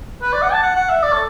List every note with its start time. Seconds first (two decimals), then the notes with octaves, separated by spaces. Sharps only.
0.22 B4
0.33 D5
0.42 F#5
0.53 A5
0.63 F#5
0.76 F#5
0.89 E5
1.03 D5
1.13 A4